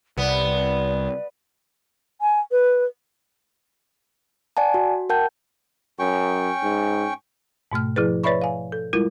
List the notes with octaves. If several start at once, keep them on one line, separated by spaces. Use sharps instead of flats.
C2 B3 D5
G#5
B4
D5 F#5 G#5 A5
F#4
A#4 F#5 G5 A5 G6
F#2 C#4 G5 C#6
G#2
G#2 B2 A3 F6
F3 E4 G#4 B4
B4 C#5 D5 E5 B5 C#6
F5 G#5
A4
G3 G#3 E4 F4 A#4